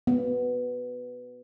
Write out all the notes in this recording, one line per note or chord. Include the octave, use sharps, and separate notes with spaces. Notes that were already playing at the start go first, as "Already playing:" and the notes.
B3